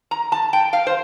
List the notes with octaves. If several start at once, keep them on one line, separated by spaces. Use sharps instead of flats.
A#5
A5
G5
F5
C5